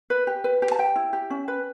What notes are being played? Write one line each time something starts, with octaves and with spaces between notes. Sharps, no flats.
B4
G4
B4
G4
A5
G4 G5
E4
G4
C#4
B4